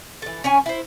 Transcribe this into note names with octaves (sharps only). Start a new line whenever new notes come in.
E3 A4
C#4 C#5 G#5
E4 C5